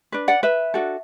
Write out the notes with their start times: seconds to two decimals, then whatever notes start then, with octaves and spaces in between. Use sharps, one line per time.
0.12 D4 B4
0.28 D5 F#5
0.43 B4 E5
0.74 D4 F#4 A4